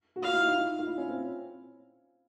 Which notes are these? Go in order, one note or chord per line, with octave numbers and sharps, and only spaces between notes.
F#4
F4 F5
E4
D#4
D#4
F4
E4
C#4
C4